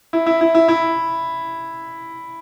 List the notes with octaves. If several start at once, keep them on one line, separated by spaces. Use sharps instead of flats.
E4
E4
E4
E4
E4